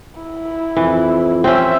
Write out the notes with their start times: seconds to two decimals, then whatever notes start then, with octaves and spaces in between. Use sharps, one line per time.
0.20 E4
0.77 F2 E3
1.44 C4 C#4 E5